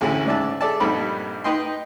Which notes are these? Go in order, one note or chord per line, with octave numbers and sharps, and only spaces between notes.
A1 D2 D3 C#4 E4 G#5
G#2 C#3 D5 E5 A5
G#4 A4 D5 E5 A5
A#1 G2 C4 D#4 A4 B5
D#4 B4 D#5 G5 C6